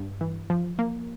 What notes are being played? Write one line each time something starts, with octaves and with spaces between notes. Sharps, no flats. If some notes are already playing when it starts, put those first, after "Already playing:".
Already playing: G2
E3
F3
A#3